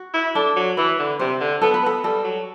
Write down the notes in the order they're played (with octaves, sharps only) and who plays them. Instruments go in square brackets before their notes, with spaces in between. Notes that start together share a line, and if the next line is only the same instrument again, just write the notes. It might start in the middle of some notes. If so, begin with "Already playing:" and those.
Already playing: [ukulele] F#4
[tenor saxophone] E4
[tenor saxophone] D4 [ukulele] A4
[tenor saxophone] F#3
[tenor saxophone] E3 [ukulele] B4
[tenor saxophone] D3
[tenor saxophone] C3 [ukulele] C5
[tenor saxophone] D3
[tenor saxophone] B3 [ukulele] A4
[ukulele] B4
[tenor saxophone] B3 [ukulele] A4
[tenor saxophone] G3 [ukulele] A4
[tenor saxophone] F#3